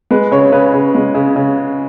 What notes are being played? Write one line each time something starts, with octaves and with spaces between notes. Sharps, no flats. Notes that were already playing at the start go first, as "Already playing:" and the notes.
G#3 B4
C#3 C#5
C#3 B4
C#3
G#3
C#3
C#3